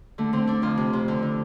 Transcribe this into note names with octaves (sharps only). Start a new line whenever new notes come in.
D3 A3
D3 C4
D3 D4
F2 F4
C3
C3
D3
D3